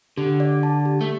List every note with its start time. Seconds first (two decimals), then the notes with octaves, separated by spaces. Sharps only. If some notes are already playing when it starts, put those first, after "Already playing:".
0.17 D3 G4
0.40 D5
0.63 A5
0.85 G4
1.01 A3